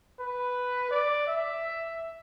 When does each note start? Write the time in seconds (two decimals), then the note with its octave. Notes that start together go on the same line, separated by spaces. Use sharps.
0.20 B4
0.91 D5
1.27 E5